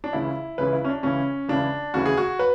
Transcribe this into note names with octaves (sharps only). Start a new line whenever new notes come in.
D4
C#2 C#3 E3 E4
C#2 C#3 E3 B4
E4
C#4
D4
C#2 C#3 E3 C#4
C#2 C#3 E3 D4
D2 C#3 E3 F#4
G#4
F#4
B4